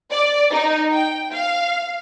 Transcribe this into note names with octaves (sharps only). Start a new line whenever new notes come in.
D5
D#4
G5
F5